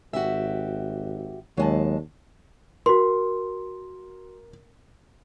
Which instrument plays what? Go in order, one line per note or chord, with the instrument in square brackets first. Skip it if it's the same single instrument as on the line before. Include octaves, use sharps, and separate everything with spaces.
[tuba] G#1 [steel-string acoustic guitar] F#4 G4 E5
[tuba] D#2 [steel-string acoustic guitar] F#3 G#3 A5
[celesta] F#4 C6 [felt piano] A#4